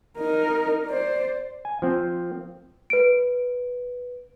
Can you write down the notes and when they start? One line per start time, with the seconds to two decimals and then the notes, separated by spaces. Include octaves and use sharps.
0.18 D#4 A#4
0.86 C5 D5
1.65 G#5
1.82 F3 C4
2.90 B4 D7